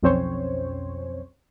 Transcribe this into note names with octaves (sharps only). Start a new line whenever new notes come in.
B1 F2 C4 C#4 C5 C#5